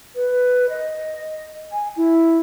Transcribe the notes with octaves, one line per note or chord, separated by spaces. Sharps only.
B4
D#5
G#5
E4